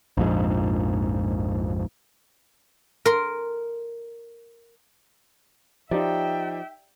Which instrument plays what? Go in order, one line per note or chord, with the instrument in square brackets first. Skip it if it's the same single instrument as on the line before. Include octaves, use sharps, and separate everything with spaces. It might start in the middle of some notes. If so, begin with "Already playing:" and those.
[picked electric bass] A#1 F2 G#2
[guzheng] A#4 C6
[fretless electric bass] F3 [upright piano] D#4 G4 D5 [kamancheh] E5 G5